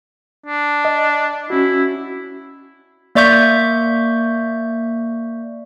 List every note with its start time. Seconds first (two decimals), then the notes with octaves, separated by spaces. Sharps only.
0.46 D4
0.85 D#5
1.50 C#4 E4 F#4
3.15 A#3 D5 E5 C#6 G6